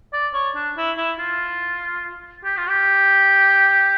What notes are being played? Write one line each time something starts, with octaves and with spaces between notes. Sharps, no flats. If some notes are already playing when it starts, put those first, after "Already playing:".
D5
C#5
D4
E4
E4
F4
G4
F4
G4